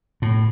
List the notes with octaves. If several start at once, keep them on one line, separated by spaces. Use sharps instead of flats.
A2